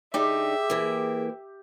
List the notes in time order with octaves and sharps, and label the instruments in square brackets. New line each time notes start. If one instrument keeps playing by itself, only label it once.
[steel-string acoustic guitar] D3 D4 D#4 [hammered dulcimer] G4 [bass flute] G#4 [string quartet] E5
[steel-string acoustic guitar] E3 A#3